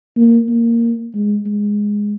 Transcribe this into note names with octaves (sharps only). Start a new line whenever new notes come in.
A#3
A#3
G#3
G#3